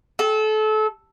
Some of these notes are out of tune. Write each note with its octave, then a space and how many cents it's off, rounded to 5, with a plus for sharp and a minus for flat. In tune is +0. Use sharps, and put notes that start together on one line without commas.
A4 -30